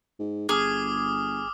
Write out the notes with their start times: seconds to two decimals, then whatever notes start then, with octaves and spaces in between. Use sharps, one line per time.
0.20 G#2
0.49 G1 G#4 D6 D#6 F6